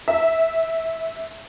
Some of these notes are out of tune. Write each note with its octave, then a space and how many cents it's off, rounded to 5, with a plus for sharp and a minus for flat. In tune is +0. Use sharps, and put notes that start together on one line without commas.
E5 -15